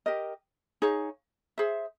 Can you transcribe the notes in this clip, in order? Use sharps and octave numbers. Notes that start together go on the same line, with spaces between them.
G4 A#4 D#5
D#4 G#4 C#5 F5
G#4 C5 E5